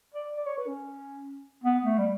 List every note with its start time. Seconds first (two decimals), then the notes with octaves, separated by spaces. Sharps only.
0.14 D5
0.36 D5
0.46 C#5
0.58 B4
0.67 C#4
1.64 B3
1.85 A3
1.98 G3